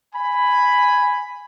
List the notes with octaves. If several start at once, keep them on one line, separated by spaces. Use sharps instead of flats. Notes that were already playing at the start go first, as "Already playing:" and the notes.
G#5 B5